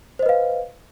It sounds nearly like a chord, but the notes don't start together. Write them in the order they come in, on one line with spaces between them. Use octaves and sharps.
C5 D#5 B4 F5